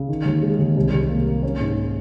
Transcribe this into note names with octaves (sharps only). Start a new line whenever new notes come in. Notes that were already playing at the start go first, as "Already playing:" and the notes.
Already playing: C#3
D#3
D#2
G#3
D#2
C2
C2
A#3
A#3
C#4
G#2